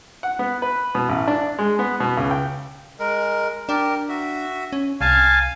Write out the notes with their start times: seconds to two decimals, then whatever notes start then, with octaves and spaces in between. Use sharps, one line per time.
0.23 F#5
0.39 B3
0.62 B4
0.95 B2
1.09 A1
1.28 D4
1.59 G#3
1.79 B3
2.00 B2
2.17 C#2
2.31 G5
2.99 G#3 A#4
3.69 D4 G4 A#4
4.09 F#4 E5
4.73 C#4
5.01 C2 F5 G#5 A5